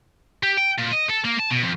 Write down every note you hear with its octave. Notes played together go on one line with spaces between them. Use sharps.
G4
G5
A#2
D#5
A4
A#3
A5
B2
F2